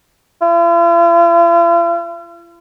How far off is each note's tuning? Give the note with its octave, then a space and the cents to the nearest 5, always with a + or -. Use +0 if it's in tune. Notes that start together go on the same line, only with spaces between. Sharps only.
F4 -45